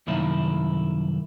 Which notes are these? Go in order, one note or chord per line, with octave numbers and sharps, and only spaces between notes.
C2 F#2 D#3 A#3 E4